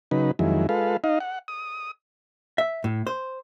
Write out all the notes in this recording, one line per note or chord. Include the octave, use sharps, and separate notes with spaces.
C#3 F#3 D#4 B4
F2 D#3 F#3 G#3 E4
G#3 F4 A4 B4 F5
D#4 D#5 F5
F#5
D#6
E5
A2
C5